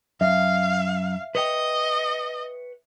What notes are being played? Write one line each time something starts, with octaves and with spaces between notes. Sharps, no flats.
F#2 E5 F5
B4 C#5 D#5 G5